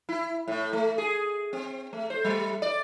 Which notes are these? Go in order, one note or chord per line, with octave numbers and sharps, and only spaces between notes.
E4
A2
A3
G#4
C4
A3
C5
G3
D5